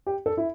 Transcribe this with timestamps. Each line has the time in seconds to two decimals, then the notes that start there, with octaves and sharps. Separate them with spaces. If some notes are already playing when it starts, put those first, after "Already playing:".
0.07 G4
0.26 A4
0.37 E4